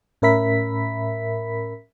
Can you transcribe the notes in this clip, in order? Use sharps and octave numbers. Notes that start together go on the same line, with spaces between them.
A2 C#4 A#4 E5 B5 B6